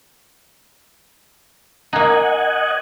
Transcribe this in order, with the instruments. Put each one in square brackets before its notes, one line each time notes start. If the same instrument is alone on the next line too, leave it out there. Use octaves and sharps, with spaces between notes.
[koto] A#3 D#4 [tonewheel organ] D#5 F#5 G#5